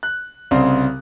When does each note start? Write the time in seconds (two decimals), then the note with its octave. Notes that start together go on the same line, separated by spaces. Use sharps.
0.03 F#6
0.51 C2 C#3 C4 C6